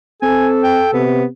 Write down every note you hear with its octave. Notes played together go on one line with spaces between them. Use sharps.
C4 A4 G#5
G5
C3 B3